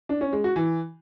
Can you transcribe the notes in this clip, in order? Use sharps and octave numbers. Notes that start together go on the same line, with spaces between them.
D4
C#4
G#3
F#4
E3